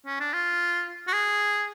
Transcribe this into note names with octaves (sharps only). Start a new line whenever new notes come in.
C#4
D4
F4
F#4
G#4